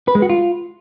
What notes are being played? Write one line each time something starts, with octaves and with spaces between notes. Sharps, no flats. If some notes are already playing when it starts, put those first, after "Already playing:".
B4
G#3
F#4
F4